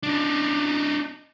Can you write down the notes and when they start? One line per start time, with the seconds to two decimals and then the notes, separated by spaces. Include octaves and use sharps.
0.03 D4 D#4